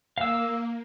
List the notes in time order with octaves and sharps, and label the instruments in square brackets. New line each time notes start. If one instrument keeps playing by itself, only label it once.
[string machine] A#3 [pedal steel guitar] F5 E6